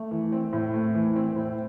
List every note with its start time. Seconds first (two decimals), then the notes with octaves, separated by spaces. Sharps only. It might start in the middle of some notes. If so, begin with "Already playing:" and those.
Already playing: A3
0.11 E3
0.32 C4
0.53 A2
0.74 A3
0.94 E3
1.16 C4
1.36 A2